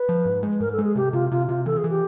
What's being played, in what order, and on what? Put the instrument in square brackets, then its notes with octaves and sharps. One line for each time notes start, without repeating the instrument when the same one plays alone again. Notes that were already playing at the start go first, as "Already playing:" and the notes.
Already playing: [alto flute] B4
[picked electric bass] F3
G#2
G#3
[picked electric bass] G#2 [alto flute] A#4
[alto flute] A4
[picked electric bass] G#3
[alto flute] G#4
[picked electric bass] C3 [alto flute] G4
[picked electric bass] C3 [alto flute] F4
[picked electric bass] C3 [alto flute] F4
[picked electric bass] C3 [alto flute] F4
[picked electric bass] E3 [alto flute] A4
[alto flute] G#4
[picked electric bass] E3
[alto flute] G4